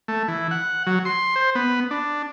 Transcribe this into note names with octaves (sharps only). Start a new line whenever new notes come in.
A3
E3
F#5
F#3
C6
C5
B3
D4